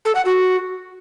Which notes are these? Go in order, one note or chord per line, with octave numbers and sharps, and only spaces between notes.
A4
F#5
F#4